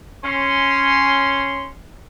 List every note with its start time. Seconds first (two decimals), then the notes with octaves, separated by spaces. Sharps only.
0.25 C#4 C6